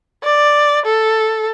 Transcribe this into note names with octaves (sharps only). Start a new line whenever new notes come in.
D5
A4